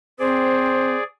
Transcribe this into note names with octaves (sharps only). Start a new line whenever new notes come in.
C4 G#4 C5 D5